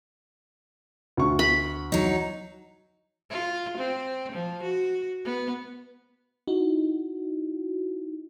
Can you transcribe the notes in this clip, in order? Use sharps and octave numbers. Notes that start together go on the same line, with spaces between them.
D2 C#6
B5
F#3 D#4
F4
C4
F3
F#4
B3
D#4 E4 F#4